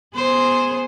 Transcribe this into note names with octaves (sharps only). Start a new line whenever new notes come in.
B3 G#4 C5